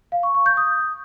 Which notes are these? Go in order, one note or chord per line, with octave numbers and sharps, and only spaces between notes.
F5
C#6
C#6
G6
D#6